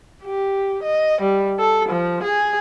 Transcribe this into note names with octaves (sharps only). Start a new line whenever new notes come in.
G4
D#5
G3
A4
F3
G#4